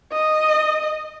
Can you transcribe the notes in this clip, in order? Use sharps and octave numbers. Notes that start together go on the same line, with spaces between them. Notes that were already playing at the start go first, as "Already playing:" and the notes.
D#5